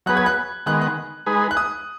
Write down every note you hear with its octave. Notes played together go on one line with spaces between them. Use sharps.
F#3 B3 G#4 B4 F#6
G#6
F#6
D#3 G#3 B3 F#6
F#6
G#3 D#4 G#4 B4
F#6
D#6